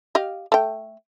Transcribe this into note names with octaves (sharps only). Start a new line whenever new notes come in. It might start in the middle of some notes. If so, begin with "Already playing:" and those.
G4 D#5 F5
A3 G5